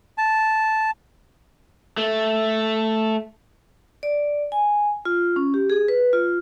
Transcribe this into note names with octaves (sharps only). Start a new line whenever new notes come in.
A5
A3
D5
G#5
F4
C#4
G4
G#4
B4
F4